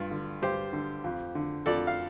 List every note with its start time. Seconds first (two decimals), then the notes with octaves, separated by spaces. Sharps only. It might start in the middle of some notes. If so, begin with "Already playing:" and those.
Already playing: G2 F4
0.11 D3
0.42 G2 G4 C5
0.73 D3
1.04 F2
1.35 D3
1.66 F2 A4 D5
1.87 F5